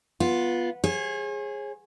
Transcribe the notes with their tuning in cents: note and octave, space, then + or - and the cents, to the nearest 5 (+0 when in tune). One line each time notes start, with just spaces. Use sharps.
B3 -15 F4 +0
G#4 -5 C#5 -45